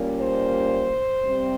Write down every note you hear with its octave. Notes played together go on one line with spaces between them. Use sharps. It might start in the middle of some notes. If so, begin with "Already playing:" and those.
Already playing: A#2 G3 A#3 C#4
C5
C3 G3 C4